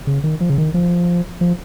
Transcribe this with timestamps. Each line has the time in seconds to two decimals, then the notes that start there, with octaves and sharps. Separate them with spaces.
0.07 C#3
0.24 D#3
0.40 F3
0.50 C#3
0.58 D#3
0.74 F3
1.41 F3